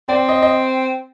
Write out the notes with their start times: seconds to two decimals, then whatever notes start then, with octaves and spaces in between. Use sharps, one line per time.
0.09 C4 D5
0.29 D#5
0.42 D#5